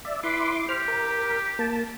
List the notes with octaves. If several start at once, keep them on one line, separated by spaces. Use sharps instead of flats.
D5 E5
E4 B4 C6 D6
G4 C5 F6
A#4
A#3 A5